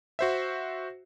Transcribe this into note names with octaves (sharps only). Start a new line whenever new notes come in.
F#4 C5 E5